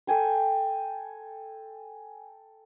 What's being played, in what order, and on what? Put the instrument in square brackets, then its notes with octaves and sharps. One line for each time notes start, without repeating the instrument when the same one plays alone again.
[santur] A4 G5 G#5 C6